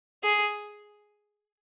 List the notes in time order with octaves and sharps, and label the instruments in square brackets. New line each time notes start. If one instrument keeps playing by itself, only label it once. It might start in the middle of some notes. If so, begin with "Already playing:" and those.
[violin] G#4